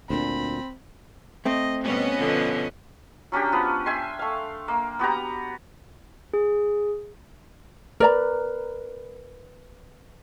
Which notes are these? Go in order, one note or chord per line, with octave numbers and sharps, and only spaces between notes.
D2 A#2 C4 D4 B5
A3 C4 D#5
B2 G3 B3 C#4 D#5
B2 D3 F3
F#3 C#4 D4 G4
F3 B3
E5 G5 G#5 C6
A3 F5
A#3
B3 F#4 G4 A#5
G#4
A#4 B4 D5 A#5